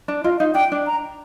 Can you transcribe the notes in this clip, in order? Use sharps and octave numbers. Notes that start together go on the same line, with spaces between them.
D4
F4 D#5
D#4 F5
D4 G5
D4
A#5